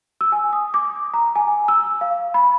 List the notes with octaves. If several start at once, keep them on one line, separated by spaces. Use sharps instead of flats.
E6
G#5
D#6
D6
A#5
G#5
E6
F5
B5